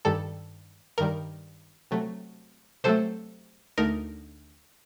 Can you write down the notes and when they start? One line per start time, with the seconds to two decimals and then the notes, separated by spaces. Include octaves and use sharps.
0.05 G2 D#3 G3 A4
0.98 G2 D#3 G3 A#4
1.91 C3 F#3 A3
2.84 C3 F#3 A3 A4 C5
3.78 D2 D3 A3 D#4 A#4